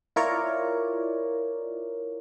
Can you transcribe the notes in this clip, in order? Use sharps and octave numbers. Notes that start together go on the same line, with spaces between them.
E4 F4 A#4 C#5 D5